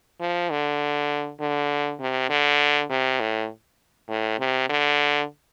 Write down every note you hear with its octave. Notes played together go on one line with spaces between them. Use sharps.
F3
D3
D3
C3
D3
C3
A2
A2
C3
D3